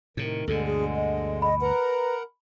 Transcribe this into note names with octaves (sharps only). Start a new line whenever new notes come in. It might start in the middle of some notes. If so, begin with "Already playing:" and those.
A2 C3 D#3
D2 G2 B2 D3 G#3 A4
G#4
D#5
D#5 B5
A#4 B4 F#5 A#5